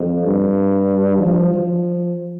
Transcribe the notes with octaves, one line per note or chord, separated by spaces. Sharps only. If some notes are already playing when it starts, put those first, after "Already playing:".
Already playing: F2
G2
F3
F3